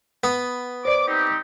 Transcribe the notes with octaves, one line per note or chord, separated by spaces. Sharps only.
B3
C5 D5 D6
C4 D#4 G4